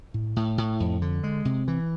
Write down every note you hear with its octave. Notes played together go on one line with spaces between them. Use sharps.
A2
A2
A2
F2
D3
G#3
C3
E3